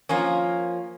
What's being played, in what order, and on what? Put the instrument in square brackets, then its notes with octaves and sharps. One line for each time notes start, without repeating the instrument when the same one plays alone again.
[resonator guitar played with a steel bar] F3 A#3 C#4